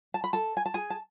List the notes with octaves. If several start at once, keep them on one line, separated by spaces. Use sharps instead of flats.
A5
B5
A4 A5
G#5
A5
G#4 G#5
A5